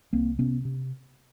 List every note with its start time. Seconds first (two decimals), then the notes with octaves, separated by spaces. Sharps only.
0.13 C2 A#3 C4
0.39 C3 B3 C#4
0.65 C3